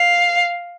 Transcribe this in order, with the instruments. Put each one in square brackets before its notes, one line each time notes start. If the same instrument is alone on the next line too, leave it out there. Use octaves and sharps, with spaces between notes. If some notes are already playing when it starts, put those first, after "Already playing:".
Already playing: [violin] F5